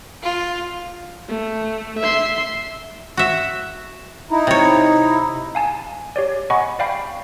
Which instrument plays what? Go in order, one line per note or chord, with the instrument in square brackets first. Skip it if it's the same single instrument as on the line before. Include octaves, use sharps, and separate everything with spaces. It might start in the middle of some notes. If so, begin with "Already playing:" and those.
[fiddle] F4
[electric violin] A3
E5 C6
[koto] F#4 E5
[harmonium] D#4 E4
[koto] C3 C#5
[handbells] F5 G#5 A5
G4 C#5 D5
D#5 F#5 G#5 B5 C#6
D5 F5 G5 B5 C7